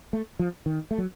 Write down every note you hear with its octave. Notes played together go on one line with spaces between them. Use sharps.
A3
F3
D#3
A3
F#3